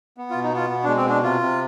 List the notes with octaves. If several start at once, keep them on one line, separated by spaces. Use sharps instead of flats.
B3
F4
B2
D#4
B3 F4
B2
G#3 D4
C4
B2 D4
C3 F4
C3